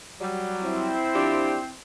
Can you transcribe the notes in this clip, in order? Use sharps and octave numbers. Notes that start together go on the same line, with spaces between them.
F#3 G3
C4 E4 C5
F3 D4 G4